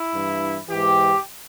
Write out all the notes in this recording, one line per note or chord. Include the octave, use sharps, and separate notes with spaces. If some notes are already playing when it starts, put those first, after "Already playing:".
Already playing: E4
G2 E3
G#2 E3 G4